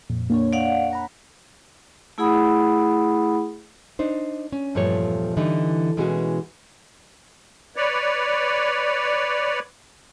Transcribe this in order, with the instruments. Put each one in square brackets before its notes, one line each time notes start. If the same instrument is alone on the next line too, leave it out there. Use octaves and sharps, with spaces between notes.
[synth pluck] F2 A#2
A#3 D4 C#5
[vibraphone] D5 F5 F#5
[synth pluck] F#5 A#5 B5
[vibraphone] A3 E4 G#4 F#5 B5 D#6
[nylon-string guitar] D4 D#4 C5
C#4
E2 G2 A#2 F3 A3 C#5
D3 E3 G3 D#4
B2 E3 G#3 C#4 F#4
[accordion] B4 C#5 D5